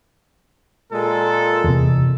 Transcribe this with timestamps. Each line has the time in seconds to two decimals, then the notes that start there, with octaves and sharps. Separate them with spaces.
0.92 A#2 G#3 A4
1.64 E2 C3